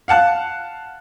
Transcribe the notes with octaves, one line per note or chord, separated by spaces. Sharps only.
F5 F#5 A5 F#6